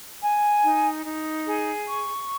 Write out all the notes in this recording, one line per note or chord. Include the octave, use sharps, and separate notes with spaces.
G#5
D#4
D#4
G#4
C#6